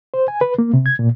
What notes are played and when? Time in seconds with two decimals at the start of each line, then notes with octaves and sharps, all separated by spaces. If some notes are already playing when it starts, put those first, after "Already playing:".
0.14 C5
0.28 G#5
0.41 B4
0.59 A#3
0.74 C3
0.86 G#6
0.99 A#2